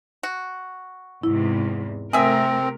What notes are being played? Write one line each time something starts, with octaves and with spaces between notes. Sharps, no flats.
F#4
E2 G#2 C3 E4
C3 A3 C4 G#4 A#4 E5